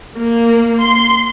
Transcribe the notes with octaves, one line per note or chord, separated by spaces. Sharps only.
A#3
C6